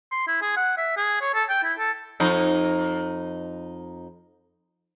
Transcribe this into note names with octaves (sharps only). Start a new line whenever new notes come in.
C6
E4
G#4
F#5
E5
G#4
C#5
A4
G5
E4
A4
F2 D#4